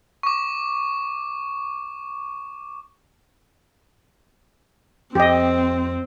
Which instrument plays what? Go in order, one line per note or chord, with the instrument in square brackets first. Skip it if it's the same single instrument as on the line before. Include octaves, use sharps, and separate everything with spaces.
[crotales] C#6 D6
[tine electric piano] F2 [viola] C4 [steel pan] G4 D#5